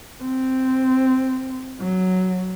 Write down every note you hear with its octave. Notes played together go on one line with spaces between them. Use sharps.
C4
F#3